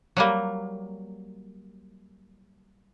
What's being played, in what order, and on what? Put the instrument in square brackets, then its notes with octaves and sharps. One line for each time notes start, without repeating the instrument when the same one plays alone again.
[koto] F#3 G3 A#3